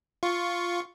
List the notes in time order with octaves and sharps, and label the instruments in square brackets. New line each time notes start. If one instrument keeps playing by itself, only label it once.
[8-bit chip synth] F4 C#6